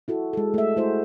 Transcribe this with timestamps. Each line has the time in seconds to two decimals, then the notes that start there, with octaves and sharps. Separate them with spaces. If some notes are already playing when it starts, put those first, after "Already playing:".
0.08 E4 F#4 A4
0.33 G#3 A4
0.54 A3 E5
0.77 A3 E4 F#4 G#4 C5